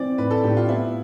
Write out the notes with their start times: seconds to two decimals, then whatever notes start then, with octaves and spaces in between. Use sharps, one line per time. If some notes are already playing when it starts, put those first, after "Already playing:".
Already playing: E3 C4 D5
0.18 A2 B4
0.31 A4
0.44 A2 G4
0.57 F4
0.69 B3 E4